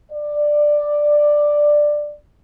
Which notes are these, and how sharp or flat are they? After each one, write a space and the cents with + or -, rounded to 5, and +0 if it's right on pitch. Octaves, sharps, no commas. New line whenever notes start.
D5 +10